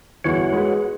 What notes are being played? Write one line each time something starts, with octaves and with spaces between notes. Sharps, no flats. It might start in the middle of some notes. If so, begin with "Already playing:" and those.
G1 E2 F#4 C#5 F#5
G#3 B4